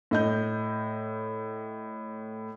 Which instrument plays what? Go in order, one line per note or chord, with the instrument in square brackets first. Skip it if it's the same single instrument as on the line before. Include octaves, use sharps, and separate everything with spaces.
[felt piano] A2 D#5 G6